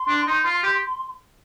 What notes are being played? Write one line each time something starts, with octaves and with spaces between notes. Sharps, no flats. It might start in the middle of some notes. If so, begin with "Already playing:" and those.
Already playing: C6
D4
D#4
F4
G4